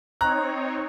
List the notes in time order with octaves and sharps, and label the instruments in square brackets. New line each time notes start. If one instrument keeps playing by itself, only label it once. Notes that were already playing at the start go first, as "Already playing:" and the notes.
[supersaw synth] C4 D#4 C#5 [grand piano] A#5 F#6